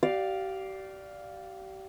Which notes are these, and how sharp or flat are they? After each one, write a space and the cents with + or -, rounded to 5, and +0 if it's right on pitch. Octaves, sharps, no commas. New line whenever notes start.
G4 -35 D5 +0 F5 +0